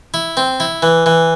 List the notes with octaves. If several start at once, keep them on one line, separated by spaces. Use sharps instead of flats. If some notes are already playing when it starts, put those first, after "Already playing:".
E4
C4
E4
E3
E3